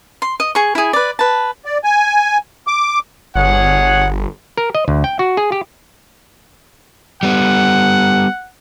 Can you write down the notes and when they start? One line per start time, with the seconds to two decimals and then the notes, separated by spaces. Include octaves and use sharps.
0.22 C6
0.40 D#5
0.55 G#4 C#6
0.75 E4 G#4
0.93 B4 D5
1.19 B4 A5
1.65 D5
1.84 G#5
2.67 D6
3.36 G1 G#4 C#5 F#5
4.57 A#4
4.75 D#5
4.88 D2
5.04 G5
5.19 F#4
5.37 G#4
5.52 G4
7.23 G3 B3 F#5